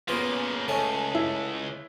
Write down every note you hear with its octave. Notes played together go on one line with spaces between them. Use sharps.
C#3 A#3 B3 F4
C#2 A3 C#4
E4